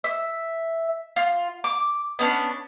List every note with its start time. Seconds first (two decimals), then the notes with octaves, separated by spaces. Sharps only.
0.04 E5
1.16 F4
1.64 D6
2.19 B3 C#4 D4